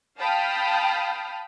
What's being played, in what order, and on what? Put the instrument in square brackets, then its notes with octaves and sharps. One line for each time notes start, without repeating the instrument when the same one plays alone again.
[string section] F5 G5 A5 B5 D#6 F6